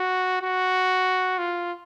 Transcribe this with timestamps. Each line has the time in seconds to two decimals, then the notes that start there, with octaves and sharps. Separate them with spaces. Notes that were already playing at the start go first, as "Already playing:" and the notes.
Already playing: F#4
0.42 F#4
1.38 F4